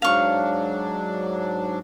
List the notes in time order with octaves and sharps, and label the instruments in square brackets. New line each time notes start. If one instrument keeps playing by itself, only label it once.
[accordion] G#2 F#3 D4 [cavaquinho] F5 C#6